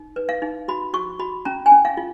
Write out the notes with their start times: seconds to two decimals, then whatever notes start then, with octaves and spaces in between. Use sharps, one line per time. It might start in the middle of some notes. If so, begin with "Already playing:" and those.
Already playing: D#4
0.16 B4
0.29 F5
0.42 D#4
0.68 F#4 B5
0.93 F#4 C#6
1.19 F#4 B5
1.45 C#4 A#5
1.66 G#5
1.72 C#4
1.85 F5
1.97 F4